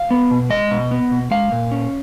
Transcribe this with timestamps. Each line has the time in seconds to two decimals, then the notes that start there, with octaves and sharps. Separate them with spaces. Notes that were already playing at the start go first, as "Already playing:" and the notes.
Already playing: F5
0.11 B3
0.31 B2
0.50 G#3 D#5
0.71 B2
0.91 B3
1.11 B2
1.31 G#3 F5
1.52 A#2
1.71 C#4